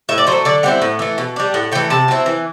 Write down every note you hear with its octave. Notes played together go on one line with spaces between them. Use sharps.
A2 E5
D5
F#3 A3 C5
D3 D5
G3 C4 E4 F#5
A2
E3 A3
B2
G3 D4
A2 F#5
E3 A3 G5
C3 A5
F#3 C4 E4
E3